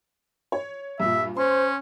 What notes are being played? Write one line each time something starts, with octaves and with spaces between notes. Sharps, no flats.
C#5
G2 A#2 E5
C#4 C5 C6